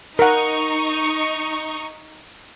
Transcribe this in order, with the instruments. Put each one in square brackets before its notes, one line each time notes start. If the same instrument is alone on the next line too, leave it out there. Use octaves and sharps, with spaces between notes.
[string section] D#4 C#6 [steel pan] A#4 F#5